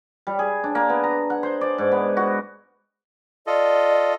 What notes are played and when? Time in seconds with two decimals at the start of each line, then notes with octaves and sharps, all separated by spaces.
0.27 G3
0.39 G#4
0.64 D4
0.75 A#3
0.89 B3
1.03 A#5
1.30 F#5
1.43 C5
1.61 D5
1.78 G#2
1.92 B3
2.17 F#4
3.47 F4 A4 D5 D#5